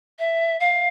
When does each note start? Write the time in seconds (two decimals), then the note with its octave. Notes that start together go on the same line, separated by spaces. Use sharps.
0.19 E5
0.60 F5